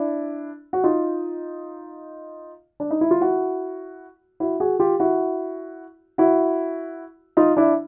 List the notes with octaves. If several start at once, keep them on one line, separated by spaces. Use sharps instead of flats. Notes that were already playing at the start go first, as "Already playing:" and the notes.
Already playing: D4 E4
F#4
D#4 F4
D4
D#4
E4
F4
E4 F#4
E4 F#4
F#4 G#4
F4 G4
E4 F#4
E4 F#4
D#4 F4
D4 E4